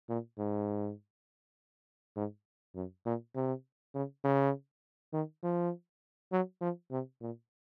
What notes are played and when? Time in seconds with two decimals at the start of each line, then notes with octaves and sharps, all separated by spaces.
0.09 A#2
0.38 G#2
2.16 G#2
2.75 F#2
3.06 A#2
3.35 C3
3.95 C#3
4.24 C#3
5.13 D#3
5.43 F3
6.32 F#3
6.61 F3
6.91 C3
7.21 A#2